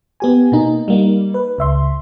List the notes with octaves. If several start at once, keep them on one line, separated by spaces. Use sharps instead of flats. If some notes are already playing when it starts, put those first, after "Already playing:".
B3 G4 G#5
B2 A#3 D#4
G3 A#3 D#4
B4
C#2 E5 C6